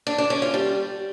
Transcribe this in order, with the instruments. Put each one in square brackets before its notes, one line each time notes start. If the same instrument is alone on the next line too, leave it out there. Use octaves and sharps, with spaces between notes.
[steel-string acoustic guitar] D4
D4
C#4
F4
G3